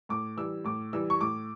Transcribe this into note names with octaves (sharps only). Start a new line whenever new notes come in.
A2 D6
E3 G3 E6
A2 D6
E3 G3 E6
C#6
A2 D6